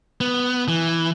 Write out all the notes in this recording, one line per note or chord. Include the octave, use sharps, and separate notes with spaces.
B3
E3